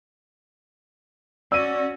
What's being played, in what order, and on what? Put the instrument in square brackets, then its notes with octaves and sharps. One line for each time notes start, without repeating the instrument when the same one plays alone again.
[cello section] C#4 F#4 [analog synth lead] D5 [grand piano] E6 D#7